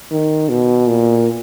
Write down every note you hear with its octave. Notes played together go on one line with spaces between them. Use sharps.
D#3
B2
A#2